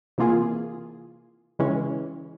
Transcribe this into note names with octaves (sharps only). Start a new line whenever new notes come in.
C3 E3 A#3 F4 G#4
C#3 E3 G#3 C#4